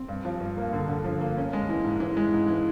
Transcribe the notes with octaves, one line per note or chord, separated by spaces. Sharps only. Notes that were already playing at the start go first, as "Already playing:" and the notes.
Already playing: C4
G2
F3
G2
A#3
D3
D3
F3
A#3
C#4
G#3
E3
G#2
E3
G#3
G#2
E3